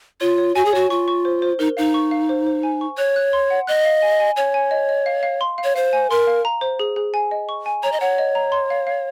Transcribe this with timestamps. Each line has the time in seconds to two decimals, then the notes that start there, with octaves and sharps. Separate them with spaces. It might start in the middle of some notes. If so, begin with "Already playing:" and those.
0.21 F4 C#5
0.38 C#5
0.55 F#4 G#5
0.65 G#4
0.73 F#4 C#5
0.90 F4 C#6
1.08 C#6
1.25 C5
1.42 C5
1.59 D#4 A#4
1.77 D#4 F5
1.94 C#6
2.11 F5
2.29 C5
2.47 C5
2.63 G#5
2.81 C#6
2.98 C#5 F#6
3.16 F#6
3.33 C6
3.50 F#5
3.67 D#5 F#6
3.85 F5
4.02 G#5
4.20 G#5
4.36 C#5 G#5
4.54 G#5
4.71 D#5
4.89 D#5
5.06 F5
5.23 F5
5.41 C6
5.58 F5
5.64 C#5
5.76 C5 F5
5.93 G#5
6.10 A#4 C6
6.27 F5
6.45 A#5
6.61 C5
6.79 G#4
6.96 G#4
7.14 G#5
7.31 D#5
7.49 C#6
7.66 G#5
7.83 C#5 A#5
7.92 D#5
8.00 C#5 F#5
8.18 D#5
8.35 A#5
8.52 C6
8.70 F5
8.87 F5